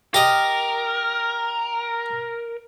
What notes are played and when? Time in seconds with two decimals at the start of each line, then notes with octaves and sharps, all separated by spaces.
0.14 G4 A#4 D#5